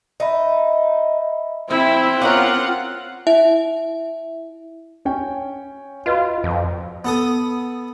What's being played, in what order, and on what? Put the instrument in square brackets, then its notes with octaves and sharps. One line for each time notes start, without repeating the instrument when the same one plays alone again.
[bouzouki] D#4 [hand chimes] D#5 E5 B5
[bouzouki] F3 [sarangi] C4 [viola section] E4
[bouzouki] B3 C#4 A#4 [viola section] F4 F#5 [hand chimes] F5 D6
[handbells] E4 [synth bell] E5
[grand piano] C#4 C#5 G5
[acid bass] F4 [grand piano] F#4 B4 D#5
[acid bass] F2
[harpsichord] B3 A4 D#6